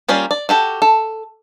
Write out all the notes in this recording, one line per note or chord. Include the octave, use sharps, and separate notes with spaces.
G3 A#3 C#4 F4 G4
D5
F#4 G4 A4
A4